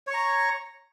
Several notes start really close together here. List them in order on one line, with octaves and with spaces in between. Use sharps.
C#5 C#6 A#5